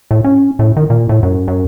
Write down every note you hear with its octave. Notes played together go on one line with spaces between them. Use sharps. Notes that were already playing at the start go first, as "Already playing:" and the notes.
A2
C#4
A2
D#3
A#2
A2
F#2
F#2